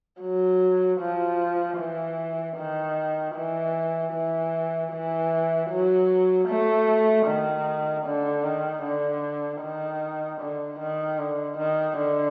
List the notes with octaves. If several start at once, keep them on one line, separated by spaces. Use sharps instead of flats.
F#3
F3
E3
D#3
E3
E3
E3
F#3
A3
D#3
D3
D#3
D3
D#3
D3
D#3
D3
D#3
D3